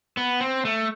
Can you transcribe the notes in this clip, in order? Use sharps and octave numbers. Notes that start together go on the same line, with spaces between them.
B3
C4
A3